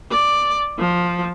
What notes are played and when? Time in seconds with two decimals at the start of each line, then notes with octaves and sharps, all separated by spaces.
0.11 D5
0.79 F3